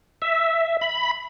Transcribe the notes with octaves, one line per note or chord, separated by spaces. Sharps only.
E5
B5